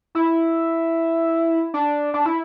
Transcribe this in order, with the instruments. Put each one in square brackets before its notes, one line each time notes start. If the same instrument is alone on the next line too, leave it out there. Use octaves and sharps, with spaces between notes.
[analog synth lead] E4
D4
D4
E4